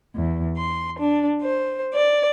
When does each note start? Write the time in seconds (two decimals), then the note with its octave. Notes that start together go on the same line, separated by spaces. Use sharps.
0.14 E2
0.56 C6
0.98 D4
1.41 C5
1.93 D5